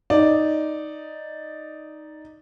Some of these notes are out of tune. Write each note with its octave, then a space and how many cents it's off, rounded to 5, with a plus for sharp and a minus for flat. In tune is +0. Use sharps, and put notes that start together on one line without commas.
D#4 +0 D5 +0